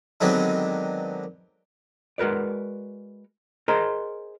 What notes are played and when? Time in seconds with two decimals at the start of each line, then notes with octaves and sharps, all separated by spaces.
0.21 D3 D#3 F#3 G#3 B3 C4
2.18 G#3 F#4 A#4 B4 D5
3.68 G#4 A#4 C5 D#5 A#5